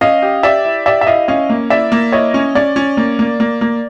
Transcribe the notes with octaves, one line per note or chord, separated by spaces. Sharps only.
C#4 D#5 F5
G4
G4 D5 E5
E4
G4 D5 E5
E5
E4 D#5 F5
C#4 D#5 F5
A#3
E4 D5 E5
A#3
E4 C#5 D#5
C#4
C#4 D5
C#4
A#3
A#3
A#3
A#3